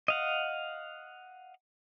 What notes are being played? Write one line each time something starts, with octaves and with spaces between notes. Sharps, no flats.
D#5 F5 F#5